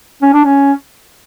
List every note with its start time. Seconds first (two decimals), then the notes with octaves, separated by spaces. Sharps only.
0.22 C#4
0.33 D4
0.45 C#4